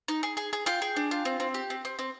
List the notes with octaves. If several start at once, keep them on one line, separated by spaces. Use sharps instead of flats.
D#4
G#4
G#4
G#4
F4 G5
G#4
D4
F4
C4
C4
G4
C4
C4
C4